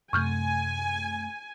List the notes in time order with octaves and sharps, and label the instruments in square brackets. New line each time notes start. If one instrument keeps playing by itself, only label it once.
[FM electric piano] F#2 C3 A3 [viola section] G#5 [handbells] C#6 F6 G6